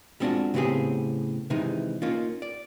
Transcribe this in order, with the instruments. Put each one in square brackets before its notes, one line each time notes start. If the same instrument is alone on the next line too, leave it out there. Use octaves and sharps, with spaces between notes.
[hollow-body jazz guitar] G3 G#3 C4 D4 F4 F#4
A2 C#3 B3 C4 G4 G#4
C3 D#3 E3 G#3 D#4
A#3 C#4 D#4 F4
D5